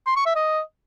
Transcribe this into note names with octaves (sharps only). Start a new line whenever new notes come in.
C6
C#6
E5
D#5